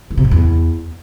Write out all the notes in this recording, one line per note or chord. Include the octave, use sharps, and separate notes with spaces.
E3
C3
G#2
E2